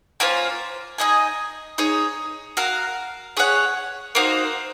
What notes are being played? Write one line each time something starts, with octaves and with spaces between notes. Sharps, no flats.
A#3 C#4 F4 C5
D#4 G#4 D#5 G#5
D#4 G#4 C#5
F#4 A#4 F5
C#4 G#4 C#5 F#5
A#3 D#4 F#4 C5